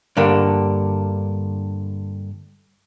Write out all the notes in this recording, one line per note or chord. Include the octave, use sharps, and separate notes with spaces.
G2 D3 A#3 D4